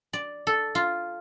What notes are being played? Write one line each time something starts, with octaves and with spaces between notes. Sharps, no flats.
D5
A4
F4